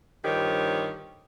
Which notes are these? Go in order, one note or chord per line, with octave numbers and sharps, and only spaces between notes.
G2 D3 D#3 F3 G4 C#5